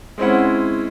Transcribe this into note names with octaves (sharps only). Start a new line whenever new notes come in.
G#3 C4 C#4 E4 F#5